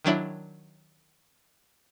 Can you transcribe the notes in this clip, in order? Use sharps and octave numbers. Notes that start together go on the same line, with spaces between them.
D#3 F#3 D4 E4